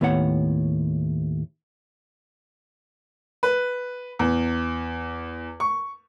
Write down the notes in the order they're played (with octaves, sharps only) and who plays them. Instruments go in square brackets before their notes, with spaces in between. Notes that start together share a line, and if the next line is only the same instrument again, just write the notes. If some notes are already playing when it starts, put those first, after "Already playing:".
[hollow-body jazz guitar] D#2 A2 B3 C#5 E5 F#5
[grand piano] B4
E2
C#6